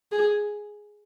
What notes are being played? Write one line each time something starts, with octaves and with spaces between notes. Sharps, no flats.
G#4